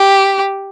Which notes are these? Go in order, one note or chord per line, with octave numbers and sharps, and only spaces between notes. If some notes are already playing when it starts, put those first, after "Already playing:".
Already playing: G4